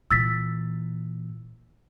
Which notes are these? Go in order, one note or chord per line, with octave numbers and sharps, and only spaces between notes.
A#2 E3 E6 A6 B6